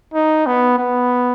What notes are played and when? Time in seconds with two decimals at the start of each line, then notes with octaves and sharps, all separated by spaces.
0.14 D#4
0.47 B3
0.78 B3